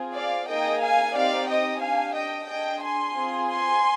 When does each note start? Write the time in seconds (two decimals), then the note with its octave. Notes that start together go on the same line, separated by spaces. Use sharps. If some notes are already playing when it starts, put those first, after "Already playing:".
Already playing: C4 F4 G#4
0.13 D5 F5
0.47 A#3 D#4 G#4 D#5 G5
0.80 F5 G#5
1.14 C4 D#4 G4 D5 F5
1.48 D#5 G5
1.80 D4 G4 F5 G#5
2.14 D#5 G5
2.47 D4 G#4 D#5 G5
2.81 G#5 C6
3.14 C4 F4 G#4
3.47 G#5 C6